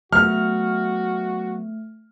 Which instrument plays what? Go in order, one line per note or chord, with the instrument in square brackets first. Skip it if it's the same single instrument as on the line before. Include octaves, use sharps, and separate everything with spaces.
[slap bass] F#3 B3 [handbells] A3 [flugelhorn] F#4 [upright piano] F6